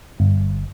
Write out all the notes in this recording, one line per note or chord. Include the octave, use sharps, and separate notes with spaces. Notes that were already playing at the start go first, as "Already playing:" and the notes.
G1